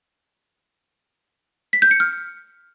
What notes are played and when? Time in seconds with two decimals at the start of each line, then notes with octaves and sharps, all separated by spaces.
1.73 B6
1.82 G6
1.91 C#7
2.00 F6